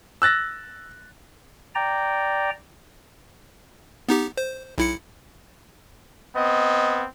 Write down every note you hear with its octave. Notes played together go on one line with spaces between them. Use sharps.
E6 F#6 A6 A#6
D5 G5 A#5
B3 D#4 G4
C5
B1 E4 C#7
B3 C4 D#5